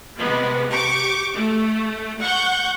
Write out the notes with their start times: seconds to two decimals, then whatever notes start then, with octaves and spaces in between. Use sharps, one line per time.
0.17 C3 G#3 B3
0.69 G4 C#6 D6
1.35 A3
2.21 F#5 C#6 G6